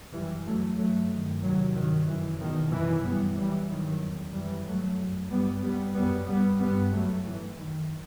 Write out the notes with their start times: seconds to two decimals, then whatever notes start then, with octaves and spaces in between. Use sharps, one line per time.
0.13 F#2 E3 G3
0.45 F#2 F#3 A3
0.77 G2 F#3 A3
1.10 G2 D#3
1.42 E2 C3 D#3 F#3
1.74 G2 D#3 F#3
2.07 F#2 E3
2.39 E2 B2 D#3
2.71 F#2 E3
3.03 F#2 G3 B3
3.36 F#2 E3 G3
3.69 G2 D#3 F#3
4.01 E2 C3
4.33 F#2 E3 G3
4.65 G2 F#3 A3
4.98 F#2
5.30 G2 G3 B3
5.62 G2 G3 B3
5.95 F#2 G3 B3
6.27 G2 G3 B3
6.59 G2 G3 B3
6.92 F#2 F#3 A3
7.25 G2 E3
7.57 F#2 D#3